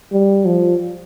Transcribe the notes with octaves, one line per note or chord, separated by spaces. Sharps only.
G3
F3